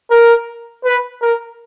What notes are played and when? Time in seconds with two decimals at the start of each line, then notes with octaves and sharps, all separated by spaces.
0.11 A#4
0.84 B4
1.22 A#4